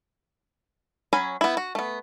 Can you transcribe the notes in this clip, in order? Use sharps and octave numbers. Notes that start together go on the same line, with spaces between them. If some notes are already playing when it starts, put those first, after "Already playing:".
F#3 C#4 G#5 B5
B3 E4
F#4
A3 B3